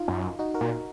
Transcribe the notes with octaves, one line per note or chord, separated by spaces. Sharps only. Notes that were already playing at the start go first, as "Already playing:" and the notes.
Already playing: D#4 F4
F#2
D#4 F#4
F#4 A#4
A#2